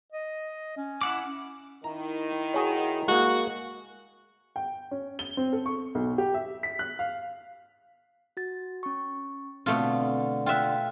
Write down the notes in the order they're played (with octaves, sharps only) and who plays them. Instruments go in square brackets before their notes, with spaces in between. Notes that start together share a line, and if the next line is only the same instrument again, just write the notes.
[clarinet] D#5
C#4
[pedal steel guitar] E4 F#5 D6
[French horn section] D#3 E4 [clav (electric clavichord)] A#5
[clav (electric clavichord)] F#4 G#4 C#5
[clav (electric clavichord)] G#3 A#3 [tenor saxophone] F#4
[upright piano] G5
C#4
G7
C4
A4
C#6
B1
G4
E5
B6
F#6
F5
[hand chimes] F#4 A6
C#4 C#6
[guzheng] B2 A3 F4 [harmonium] D3 [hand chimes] C4
[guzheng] F4 E5 [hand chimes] G5 F#6